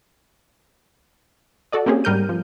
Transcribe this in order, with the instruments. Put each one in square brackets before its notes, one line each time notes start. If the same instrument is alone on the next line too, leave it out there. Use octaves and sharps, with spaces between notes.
[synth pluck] F#4 A4 D5 D#5
A#3 C4 C#4 G4 G#4
G#2 G3 A#4 F6 G6 D#7
F3